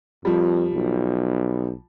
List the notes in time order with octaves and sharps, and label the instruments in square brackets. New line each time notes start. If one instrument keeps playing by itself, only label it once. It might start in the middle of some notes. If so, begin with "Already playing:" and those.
[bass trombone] F2 [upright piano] F3 G3
[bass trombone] B1